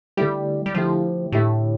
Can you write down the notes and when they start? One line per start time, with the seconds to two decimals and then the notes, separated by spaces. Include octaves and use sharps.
0.17 D3 G3 A3 E4 G4
0.66 G3
0.75 D3 F3 A3 E4 G4
1.32 A2 D3 A3 E4 G4